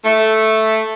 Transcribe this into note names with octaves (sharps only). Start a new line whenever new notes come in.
A3